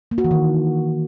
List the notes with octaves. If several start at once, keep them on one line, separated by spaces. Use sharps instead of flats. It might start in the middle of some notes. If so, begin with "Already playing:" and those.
A#3
F#4
E3
D#3